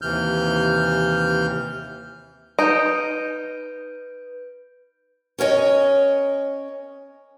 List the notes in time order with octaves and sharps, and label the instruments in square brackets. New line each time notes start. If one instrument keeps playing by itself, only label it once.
[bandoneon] D#2 C3 E3 F6 G6
[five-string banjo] D#4 [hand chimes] B4 G6 D7
[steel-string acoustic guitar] C#4 A#4 C#5 D#5